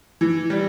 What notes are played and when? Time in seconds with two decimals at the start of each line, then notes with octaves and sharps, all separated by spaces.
0.21 E3
0.50 G3